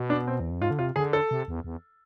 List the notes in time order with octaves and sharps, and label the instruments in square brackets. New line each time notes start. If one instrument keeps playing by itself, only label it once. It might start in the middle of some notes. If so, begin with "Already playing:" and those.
Already playing: [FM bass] B2
[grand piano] D4
C4
[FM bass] E2
F2
[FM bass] G#2 [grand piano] F4
[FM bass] D3
[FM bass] C3 [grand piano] F4
[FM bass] D3 [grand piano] G#4
[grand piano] A4
[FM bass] C3
E2
E2